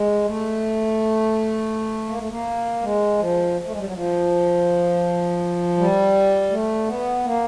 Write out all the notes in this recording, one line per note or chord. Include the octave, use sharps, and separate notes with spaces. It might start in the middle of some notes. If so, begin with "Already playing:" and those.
Already playing: G#3
A3
A#3
A3
A#3
G#3
F3
A3
G#3
G3
F#3
F3
G3
A3
B3
A#3